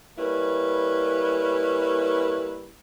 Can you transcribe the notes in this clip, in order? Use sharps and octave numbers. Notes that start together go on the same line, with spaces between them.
G3 A#3 C#4 E4 B4